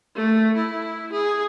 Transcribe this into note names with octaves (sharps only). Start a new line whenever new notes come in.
A3
E4
G#4